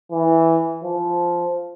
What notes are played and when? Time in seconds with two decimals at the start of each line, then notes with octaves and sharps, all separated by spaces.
0.12 E3
0.83 F3